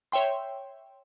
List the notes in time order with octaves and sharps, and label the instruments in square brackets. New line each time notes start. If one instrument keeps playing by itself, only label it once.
[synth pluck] C#5 E5 G5 C6